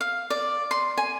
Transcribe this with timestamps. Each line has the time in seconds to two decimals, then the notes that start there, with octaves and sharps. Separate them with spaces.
0.01 F5
0.30 D5
0.71 C6
0.97 G#5